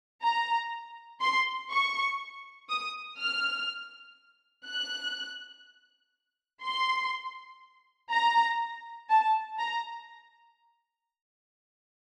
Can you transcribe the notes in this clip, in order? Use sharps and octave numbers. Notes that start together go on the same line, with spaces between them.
A#5
C6
C#6
D#6
F6
F#6
C6
A#5
A5
A#5